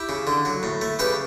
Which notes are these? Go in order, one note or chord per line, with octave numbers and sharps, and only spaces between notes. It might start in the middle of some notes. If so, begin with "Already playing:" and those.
Already playing: E4 G4
C#3
D3
F#3
A2
A3
C#3 G4 B4